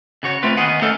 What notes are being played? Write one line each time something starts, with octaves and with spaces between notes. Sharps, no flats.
C#3 F#4 C#5
A3 C4 F4 B4
D#2 D#3 B3 G#4 F#5
A3 B3 C#4 D#4 A4 A#4